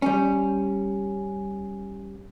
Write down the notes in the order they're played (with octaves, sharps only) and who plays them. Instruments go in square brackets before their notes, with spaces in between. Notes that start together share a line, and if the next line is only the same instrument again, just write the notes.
[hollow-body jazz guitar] G3 C#4